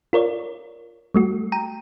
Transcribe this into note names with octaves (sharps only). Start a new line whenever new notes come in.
F4 A#4 C#5 D5
G3 A3 F#4
G5 A#5 D#7